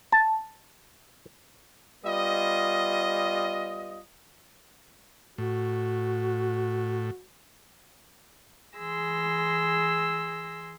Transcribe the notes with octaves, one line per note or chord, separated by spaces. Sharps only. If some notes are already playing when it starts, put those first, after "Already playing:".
A5
G3 B3 F4 D#5
A2 F#4
E3 G#4 C6 E6 A#6